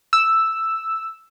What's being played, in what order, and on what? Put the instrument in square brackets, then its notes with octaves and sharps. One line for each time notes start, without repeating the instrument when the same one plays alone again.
[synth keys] E6